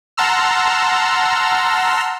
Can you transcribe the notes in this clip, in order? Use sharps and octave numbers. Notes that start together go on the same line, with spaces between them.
F#5 A5 A#5 C6 E6 F6